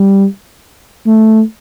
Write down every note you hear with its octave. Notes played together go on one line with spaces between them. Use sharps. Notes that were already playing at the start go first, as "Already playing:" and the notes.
Already playing: G3
A3